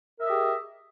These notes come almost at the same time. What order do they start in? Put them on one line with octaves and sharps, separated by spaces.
A#4 E5 D#5 G4 G#4